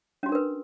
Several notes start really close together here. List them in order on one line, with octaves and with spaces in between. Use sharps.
C#4 F#4 D4 A#4 B4